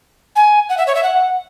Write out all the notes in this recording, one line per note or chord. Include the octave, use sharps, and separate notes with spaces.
G#5
F#5
E5
C#5
E5
F#5